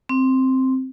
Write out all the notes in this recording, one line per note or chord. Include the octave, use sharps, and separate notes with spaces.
C4